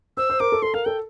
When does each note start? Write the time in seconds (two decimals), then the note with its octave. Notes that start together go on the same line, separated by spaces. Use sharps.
0.17 C5 E6
0.30 C5
0.40 A#4 D6
0.52 A4
0.62 A4 C6
0.74 A#4 F5
0.85 A4 G5